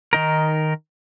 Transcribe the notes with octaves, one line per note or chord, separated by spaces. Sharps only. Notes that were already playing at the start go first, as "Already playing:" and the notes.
D#3 D#4 A#4